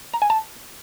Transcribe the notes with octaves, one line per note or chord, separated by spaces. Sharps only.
A#5
G#5
A5